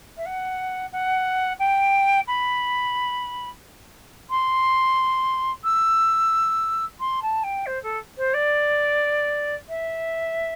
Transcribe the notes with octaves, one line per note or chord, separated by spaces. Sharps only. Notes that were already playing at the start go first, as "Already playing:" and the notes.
E5
F#5
F#5
G5
B5
C6
E6
C6
A5
G5
C5
A4
C5
D5
E5